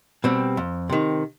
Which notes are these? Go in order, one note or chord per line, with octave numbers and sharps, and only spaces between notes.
B2 G3 C4
F2
C3 D#3